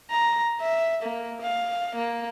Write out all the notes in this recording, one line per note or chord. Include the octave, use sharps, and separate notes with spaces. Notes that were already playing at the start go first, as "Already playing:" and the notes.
A#5
E5
A#3
F5
A#3